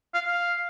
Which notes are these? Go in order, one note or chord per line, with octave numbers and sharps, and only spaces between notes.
F5
F5